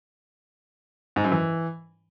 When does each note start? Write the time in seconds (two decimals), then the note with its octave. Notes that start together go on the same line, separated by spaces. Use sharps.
1.16 G#2
1.24 F#2
1.32 E3